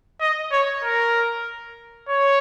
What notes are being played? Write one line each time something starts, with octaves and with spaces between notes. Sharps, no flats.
D#5
C#5
A#4
C#5